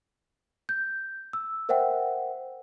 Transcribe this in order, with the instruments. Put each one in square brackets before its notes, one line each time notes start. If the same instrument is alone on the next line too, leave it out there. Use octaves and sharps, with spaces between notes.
[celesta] G6
E6
A#4 C5 E5 F#5 G5